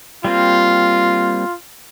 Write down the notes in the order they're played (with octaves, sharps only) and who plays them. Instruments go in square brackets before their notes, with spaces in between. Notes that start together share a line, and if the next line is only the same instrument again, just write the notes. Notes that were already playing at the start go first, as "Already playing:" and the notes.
[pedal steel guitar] G3 A#3 C4 [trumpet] F4